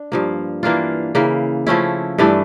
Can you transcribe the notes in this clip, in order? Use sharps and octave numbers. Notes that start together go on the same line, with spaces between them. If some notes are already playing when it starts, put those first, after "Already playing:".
Already playing: D4
G2 F3 A#3
E3 A#3 D4 F4
C#3 E3 A#3
F3 A3 C#4 E4
G2 E3 A3 D4